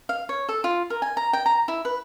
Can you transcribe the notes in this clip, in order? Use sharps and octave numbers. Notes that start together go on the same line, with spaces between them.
F5
C#5
A4
F4
A#4
G#5
A#5
G5
A#5
E4
B4